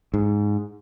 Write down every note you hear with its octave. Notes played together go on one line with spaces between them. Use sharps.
G#2